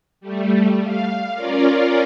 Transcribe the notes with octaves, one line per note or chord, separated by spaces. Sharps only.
G3 A3
F5
C#4 F4 A#4 D5